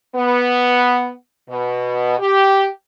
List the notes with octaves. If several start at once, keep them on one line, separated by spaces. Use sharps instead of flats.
B3
B2
G4